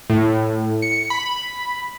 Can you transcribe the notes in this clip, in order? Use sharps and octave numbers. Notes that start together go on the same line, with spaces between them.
A2
C#7
B5